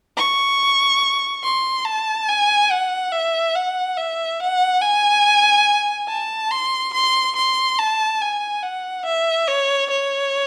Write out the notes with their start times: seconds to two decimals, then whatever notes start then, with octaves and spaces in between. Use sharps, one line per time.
0.17 C#6
1.44 C6
1.85 A5
2.29 G#5
2.71 F#5
3.12 E5
3.55 F#5
3.97 E5
4.40 F#5
4.82 G#5
6.08 A5
6.51 C6
6.94 C6
7.36 C6
7.79 A5
8.21 G#5
8.63 F#5
9.06 E5
9.48 C#5
9.90 C#5